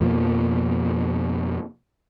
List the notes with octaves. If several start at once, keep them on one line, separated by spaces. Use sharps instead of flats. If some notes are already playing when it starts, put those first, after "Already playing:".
F2 B2 F3 A#3